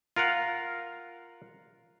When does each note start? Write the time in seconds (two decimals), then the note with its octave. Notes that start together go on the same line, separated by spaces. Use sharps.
0.16 F4 A#4 F5 F#5